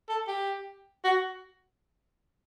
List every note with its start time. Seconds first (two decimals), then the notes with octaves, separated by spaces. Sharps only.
0.09 A4
0.28 G4
1.05 F#4